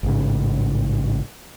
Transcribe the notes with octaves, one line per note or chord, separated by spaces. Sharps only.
A1 G#2 C#3